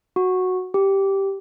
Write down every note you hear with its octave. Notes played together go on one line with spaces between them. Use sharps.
F#4
G4